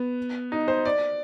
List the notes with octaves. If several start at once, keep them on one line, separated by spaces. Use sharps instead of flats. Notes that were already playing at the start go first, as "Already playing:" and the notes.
Already playing: B3
D#4
C5
D5